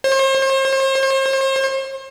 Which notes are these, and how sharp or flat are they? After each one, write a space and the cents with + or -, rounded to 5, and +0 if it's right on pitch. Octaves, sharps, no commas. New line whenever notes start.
C5 +40